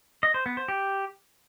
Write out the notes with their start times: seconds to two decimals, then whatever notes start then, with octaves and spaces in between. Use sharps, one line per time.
0.23 D#5
0.34 C5
0.46 B3
0.57 C5
0.68 G4